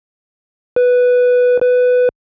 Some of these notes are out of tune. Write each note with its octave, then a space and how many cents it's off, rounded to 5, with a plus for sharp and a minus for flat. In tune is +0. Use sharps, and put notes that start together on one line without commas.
B4 +0
B4 +10